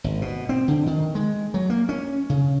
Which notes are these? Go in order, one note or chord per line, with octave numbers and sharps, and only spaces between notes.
G#1
B2
C4
D3
D#3
G#3
F#3
A#3
C#4
C#3